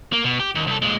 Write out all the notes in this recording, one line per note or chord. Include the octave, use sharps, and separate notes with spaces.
A#3
B2
G4
D#2
C2 A4
A#2 G#3